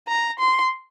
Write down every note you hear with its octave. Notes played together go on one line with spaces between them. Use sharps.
A#5
C6